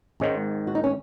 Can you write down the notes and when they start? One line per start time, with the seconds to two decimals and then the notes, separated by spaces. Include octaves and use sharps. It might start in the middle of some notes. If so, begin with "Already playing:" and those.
0.20 G#1 G#2 D#3 G#3 C#4
0.67 F#4
0.75 D#4
0.84 C#4